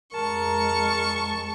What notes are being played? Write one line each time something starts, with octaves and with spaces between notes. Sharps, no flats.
F2 G#3 A#4 A5 C#6